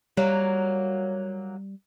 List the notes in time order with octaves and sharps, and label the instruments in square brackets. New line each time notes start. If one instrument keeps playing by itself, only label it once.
[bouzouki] F#3 A#3 [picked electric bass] G3